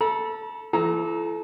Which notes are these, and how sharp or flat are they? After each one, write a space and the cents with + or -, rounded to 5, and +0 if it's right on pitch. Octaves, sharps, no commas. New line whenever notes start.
A4 +0 B5 -45
E3 +40 A4 -30 A#5 +10